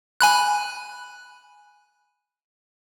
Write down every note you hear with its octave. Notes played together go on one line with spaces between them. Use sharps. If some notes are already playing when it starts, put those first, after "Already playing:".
G#5 B5 F#6